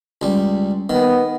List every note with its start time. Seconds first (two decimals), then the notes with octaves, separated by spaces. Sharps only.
0.22 C#2 G3
0.90 D#3 B3